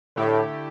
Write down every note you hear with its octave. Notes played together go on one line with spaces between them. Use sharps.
A2 D3 A3 E4 G4